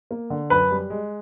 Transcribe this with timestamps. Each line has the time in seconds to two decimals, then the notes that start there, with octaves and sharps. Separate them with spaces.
0.11 A#3
0.30 D3
0.50 F#2 B4
0.71 G3
0.90 G#3